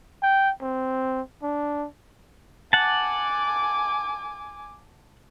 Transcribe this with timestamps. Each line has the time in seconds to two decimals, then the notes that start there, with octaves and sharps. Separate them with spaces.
0.23 G5
0.61 C4
1.43 D4
2.73 F#5 G#5 A5 D6